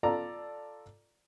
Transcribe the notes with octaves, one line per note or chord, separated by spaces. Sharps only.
F4 A4 D5 A#5